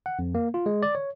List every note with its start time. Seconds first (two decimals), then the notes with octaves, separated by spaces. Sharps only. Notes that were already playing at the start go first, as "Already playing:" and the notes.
0.06 F#5
0.19 F2
0.35 A#3
0.54 F4
0.66 G#3
0.83 D5
0.95 C#5